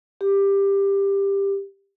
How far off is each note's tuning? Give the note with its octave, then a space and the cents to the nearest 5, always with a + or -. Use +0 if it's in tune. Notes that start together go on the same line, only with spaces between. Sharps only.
G4 +15